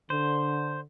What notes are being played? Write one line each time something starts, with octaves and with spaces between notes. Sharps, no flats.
D3 C5